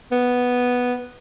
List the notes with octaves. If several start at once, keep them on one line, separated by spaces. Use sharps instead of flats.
B3